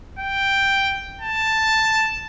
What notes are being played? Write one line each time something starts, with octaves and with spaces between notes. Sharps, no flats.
G5
A5